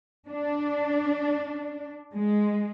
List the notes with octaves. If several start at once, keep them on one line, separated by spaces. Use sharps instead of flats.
D4
G#3